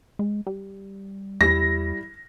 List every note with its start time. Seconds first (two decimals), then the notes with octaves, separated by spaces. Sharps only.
0.19 G#3
0.47 G3
1.41 E2 G3 E4 A#6